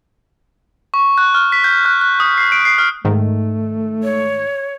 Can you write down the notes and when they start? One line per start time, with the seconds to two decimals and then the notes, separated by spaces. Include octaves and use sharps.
0.94 C#6
1.18 F#6
1.35 F6
1.52 B6
1.64 G6
1.85 F#6
2.01 F#6
2.20 D#6
2.38 C7
2.52 D7
2.65 C7
2.78 F6
3.05 G#2 D#3 A3
4.03 C#5